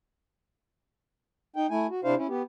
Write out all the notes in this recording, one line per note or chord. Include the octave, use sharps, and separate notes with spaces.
D#4 G5
A3 E4 G#5
F#4
C3 D4 E4 C5 F5
C#4 E4
B3 G4